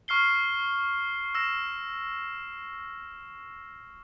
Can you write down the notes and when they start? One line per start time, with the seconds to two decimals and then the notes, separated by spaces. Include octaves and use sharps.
0.08 C#6 F6 C7 G7
1.35 E6 A#6 E7